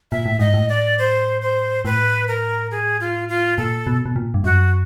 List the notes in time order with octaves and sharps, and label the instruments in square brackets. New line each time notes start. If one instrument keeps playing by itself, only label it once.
[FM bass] A#2 [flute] E5
[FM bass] A2
[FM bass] G#2 [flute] D#5
[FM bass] A2
[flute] D5
C5
C5
[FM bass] A2 [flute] B4
[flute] A#4
G#4
F4
F4
[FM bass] A#2 [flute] A4
[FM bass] B2
B2
A#2
G2
[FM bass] F#2 [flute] F#4